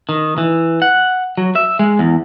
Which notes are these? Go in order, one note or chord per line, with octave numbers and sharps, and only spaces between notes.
D#3
E3
F#5
F#3
E5
G#3
E2